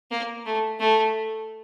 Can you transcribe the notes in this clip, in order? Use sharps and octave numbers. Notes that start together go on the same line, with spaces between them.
A#3
A3
A3